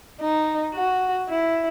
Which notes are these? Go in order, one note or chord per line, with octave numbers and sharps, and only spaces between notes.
D#4
F#4
E4